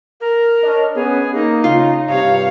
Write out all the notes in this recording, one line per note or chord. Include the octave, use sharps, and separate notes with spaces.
A#4
D4 C#5 D#5
B3 C#4 G#4
A#3 D#4
C#3 F4
G2 C3 C#5 F5